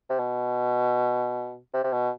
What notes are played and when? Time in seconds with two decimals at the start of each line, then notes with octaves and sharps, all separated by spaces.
0.10 C3
0.19 B2
1.74 C3
1.84 C3
1.93 B2